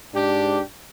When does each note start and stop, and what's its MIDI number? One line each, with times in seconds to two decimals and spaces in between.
0.14 0.60 44
0.14 0.62 62
0.14 0.60 67